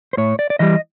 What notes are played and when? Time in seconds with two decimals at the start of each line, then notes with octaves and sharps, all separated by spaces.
0.13 C5
0.17 A2 C#5
0.39 D5
0.50 D5
0.59 E3 G3 D#5